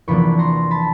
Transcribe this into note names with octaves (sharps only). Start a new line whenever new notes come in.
E2 C3 F3 A#3 D4 B5 C#6
A#5 C6
A5 B5